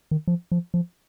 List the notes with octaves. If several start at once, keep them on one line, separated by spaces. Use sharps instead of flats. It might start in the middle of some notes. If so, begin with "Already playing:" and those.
D#3
F3
F3
F3